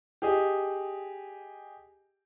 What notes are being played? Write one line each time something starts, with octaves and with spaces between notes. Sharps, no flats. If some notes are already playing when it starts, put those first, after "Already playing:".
G4 G#4 D#5